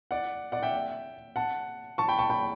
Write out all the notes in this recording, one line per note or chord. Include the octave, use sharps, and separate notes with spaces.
D5 F#5
D5 F#5
E5 G5
F#5 A5
A5 C#6
G5 B5
A5 C#6
G5 B5